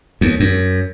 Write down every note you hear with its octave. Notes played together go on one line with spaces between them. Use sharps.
D#2
F#2